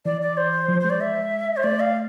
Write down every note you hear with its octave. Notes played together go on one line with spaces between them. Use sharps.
E3 D5
D5
C5
F3
G#3 C5
D5
E5
C5
A3 D5
F5